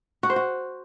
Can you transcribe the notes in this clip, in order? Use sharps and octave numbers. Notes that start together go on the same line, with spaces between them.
F#4
C5
F#4